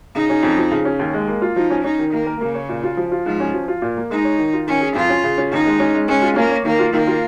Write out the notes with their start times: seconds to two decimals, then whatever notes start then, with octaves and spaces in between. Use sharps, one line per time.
0.15 C#3 D#4
0.29 C#4
0.43 F2
0.58 F3
0.72 C#3
0.85 C#4
0.99 D#2
1.14 G#3
1.27 A#3
1.42 F4
1.56 F3 D#4
1.70 C#4
1.84 C#4 D#4
1.99 D#3
2.12 D#3 A#3
2.27 A#4
2.40 C#3 A#3
2.55 C#5
2.69 A#2
2.83 F4
2.97 F3
3.12 F4
3.26 G#2 F3
3.40 C#4
3.54 F3
3.68 F4
3.82 A#2
3.97 A#3
4.10 G#3 D#4
4.25 C#5
4.38 D#3
4.53 F4
4.67 D#3 C#4
4.81 G#4
4.95 F2 F4
5.10 C#4
5.24 C#3
5.38 C#4
5.52 D#2 D#4
5.66 G#3
5.80 C#4
5.94 G#3
6.08 G#3 C#4
6.22 F4
6.36 A#3 C#4
6.51 C#5
6.65 D#3 A#3
6.79 F4
6.93 D#3 A#3
7.07 F4